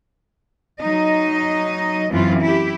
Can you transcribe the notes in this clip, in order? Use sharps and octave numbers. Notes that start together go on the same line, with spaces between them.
F#3 D#4 D#5
F#2 E3 C4 F4
E4 G4